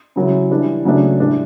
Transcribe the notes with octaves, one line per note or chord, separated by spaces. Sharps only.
C#3 F#3 C#4 E4
E3 G3 D4
C#3 F#3 A3 D4
A2 G3 D4